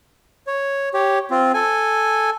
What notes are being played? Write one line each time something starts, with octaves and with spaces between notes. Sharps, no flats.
C#5
G4 C#5
C4 F4
A4 G#5